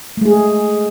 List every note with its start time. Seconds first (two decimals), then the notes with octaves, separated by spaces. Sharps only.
0.17 A3
0.21 G#3
0.25 G#4